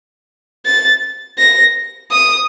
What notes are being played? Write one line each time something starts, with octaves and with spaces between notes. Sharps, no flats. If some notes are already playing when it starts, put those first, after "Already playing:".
A6
A#6
D#6